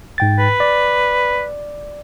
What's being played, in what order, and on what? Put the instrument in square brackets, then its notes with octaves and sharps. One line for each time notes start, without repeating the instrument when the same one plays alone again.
[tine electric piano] G#2 G5 A6
[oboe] B4
[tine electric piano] D5